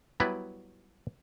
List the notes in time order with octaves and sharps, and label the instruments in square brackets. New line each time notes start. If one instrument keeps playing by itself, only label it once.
[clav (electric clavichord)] F#3 G3 B3 E4 B4 D5